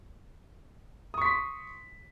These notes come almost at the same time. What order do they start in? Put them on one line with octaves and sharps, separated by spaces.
D#6 C#6 B6 C6